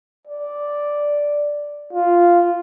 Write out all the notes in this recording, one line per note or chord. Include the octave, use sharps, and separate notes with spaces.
D5
F4